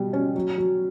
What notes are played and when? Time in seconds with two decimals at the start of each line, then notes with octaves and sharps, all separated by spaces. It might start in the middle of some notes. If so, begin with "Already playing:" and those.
Already playing: B2 G3
0.13 C#4
0.35 F#3
0.58 F#3